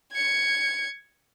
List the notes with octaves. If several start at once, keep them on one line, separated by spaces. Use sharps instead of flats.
G#6 C#7